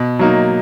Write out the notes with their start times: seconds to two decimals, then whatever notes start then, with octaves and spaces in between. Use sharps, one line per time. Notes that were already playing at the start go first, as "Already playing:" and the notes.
Already playing: B2
0.19 F#3 A#3 D#4